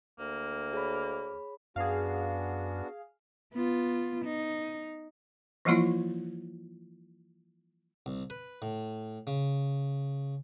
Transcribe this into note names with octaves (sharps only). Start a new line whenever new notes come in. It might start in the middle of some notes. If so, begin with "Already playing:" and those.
D2 A#3
G#4 C#5 B5
F#2 B3 D4 F#4 G#4 F5
B3 F4
D#4
E3 F3 G3 A#3 E4 F4
C2
B4
A2
C#3